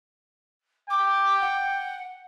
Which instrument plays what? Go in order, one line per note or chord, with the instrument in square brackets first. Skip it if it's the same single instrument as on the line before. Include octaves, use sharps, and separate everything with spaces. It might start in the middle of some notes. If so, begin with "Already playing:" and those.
[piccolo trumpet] G5 [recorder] D6
[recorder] F#5